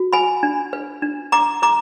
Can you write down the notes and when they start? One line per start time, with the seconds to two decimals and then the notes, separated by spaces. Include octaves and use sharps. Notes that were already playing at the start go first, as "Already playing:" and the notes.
Already playing: F#4
0.13 B4 G#5 B5
0.43 D4
0.73 B4
1.02 D4
1.32 B4 A#5 D6
1.62 B4 A#5 D6